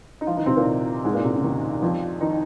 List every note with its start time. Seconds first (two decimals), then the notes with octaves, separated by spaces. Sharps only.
0.21 D#4
0.27 F3 F4
0.37 D#3 D#4
0.46 C3 C4
0.56 A#2 A#3
1.05 G#2 G#3
1.14 A#2 A#3
1.24 C3
1.33 C#3
1.44 D#2 D#3
1.82 F2 F3
2.21 D#3 D#4